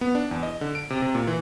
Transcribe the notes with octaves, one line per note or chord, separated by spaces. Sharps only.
B3
D4
E2
D#5
D3
D7
C3
C3
A#2
E3